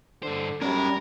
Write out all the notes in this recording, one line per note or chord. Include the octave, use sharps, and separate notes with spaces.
G2 D3 C5
F#2 G3 C#4 A#4 D5